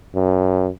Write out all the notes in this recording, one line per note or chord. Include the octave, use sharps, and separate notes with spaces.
F#2